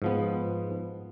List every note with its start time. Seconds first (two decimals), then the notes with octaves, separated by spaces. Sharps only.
0.02 G#2 F3 B3